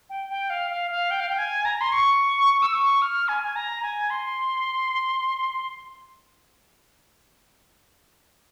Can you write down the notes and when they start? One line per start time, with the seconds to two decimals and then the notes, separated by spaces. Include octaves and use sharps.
0.10 G5
0.29 G5
0.50 F5
0.70 F5
0.91 F5
1.11 G5
1.20 F5
1.29 G5
1.38 G#5
1.65 A#5
1.81 C6
1.92 C#6
2.62 E6
2.74 C#6
3.02 F6
3.28 G#5
3.43 G#5
3.56 A#5
3.83 G#5
4.10 C6